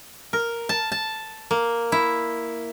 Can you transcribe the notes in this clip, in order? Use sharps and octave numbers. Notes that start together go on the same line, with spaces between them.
A#4
A5
A5
A#3
E4